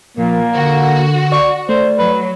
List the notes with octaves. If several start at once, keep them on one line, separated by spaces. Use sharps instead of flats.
A#2 F3 A#3
D3 F#4
D5 C#6
A3 C5 D5
F#3 B4